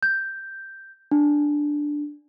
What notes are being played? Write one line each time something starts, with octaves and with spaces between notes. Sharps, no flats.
G6
D4